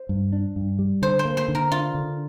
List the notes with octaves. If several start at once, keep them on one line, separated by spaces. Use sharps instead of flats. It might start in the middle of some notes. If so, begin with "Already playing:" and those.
Already playing: C5
G2
D4
G2
G3
D3 C5
C5
A#3
C5
D3
A#4
D4 F4
D3